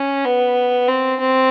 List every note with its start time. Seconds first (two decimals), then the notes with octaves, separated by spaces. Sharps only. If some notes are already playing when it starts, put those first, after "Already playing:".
Already playing: C#4
0.25 B3
0.88 C4
1.20 C4